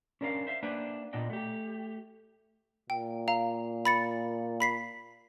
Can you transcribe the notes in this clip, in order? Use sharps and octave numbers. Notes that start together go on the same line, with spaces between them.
C#4 D4 A#4 D5 F5
C5 E5 F5
A#3 D4 B4 C5 E5 G5
A#2 B3 D4 D#5 G5
A3 G4
A#2 G5
F5 A#5
B5 A6 C#7
B5 B6 C7